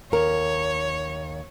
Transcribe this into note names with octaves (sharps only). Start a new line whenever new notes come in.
D#2 A#4 C#5